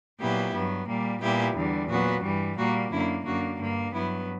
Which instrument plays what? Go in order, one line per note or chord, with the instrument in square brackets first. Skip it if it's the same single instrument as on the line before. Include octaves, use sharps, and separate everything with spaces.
[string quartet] A#2 F#3 B3 E4 G4
G2 F#3 B3
A#2 G3 A#3
A#2 G3 B3 E4 G4
E2 D3 G3
A#2 F#3 B3 F#4
G2 E3 G3
A#2 G3 A#3 F#4
F#2 D3 A#3 E4
F#2 D3 A#3 F#4
G2 D3 A#3
G2 F#3 B3 E4